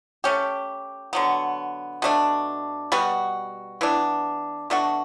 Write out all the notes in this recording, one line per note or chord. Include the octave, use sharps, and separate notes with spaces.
A3 C#4 G4
D3 F#3 B3
B2 A3 D4
B2 G3 B3 F#4
E3 B3 D4
B2 A3 D4 F#4